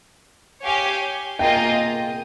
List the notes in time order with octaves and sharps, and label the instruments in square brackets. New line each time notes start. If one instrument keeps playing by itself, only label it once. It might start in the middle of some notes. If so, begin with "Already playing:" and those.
[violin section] G4 C#5 F5 G#5
[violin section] A#3 F4 G#4 D#5 [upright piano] G5